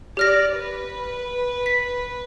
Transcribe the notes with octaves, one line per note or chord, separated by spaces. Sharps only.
G4 D5 F6 A#6
B4
B6